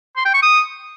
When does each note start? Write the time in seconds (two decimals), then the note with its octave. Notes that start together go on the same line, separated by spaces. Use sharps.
0.16 C6
0.25 G5
0.34 C#6
0.43 D#6